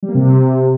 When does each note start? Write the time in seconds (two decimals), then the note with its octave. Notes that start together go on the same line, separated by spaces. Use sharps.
0.03 G3
0.09 A#3
0.15 C3